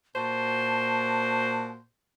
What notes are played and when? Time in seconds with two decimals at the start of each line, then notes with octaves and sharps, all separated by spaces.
0.16 A#2 F#4 C5 A5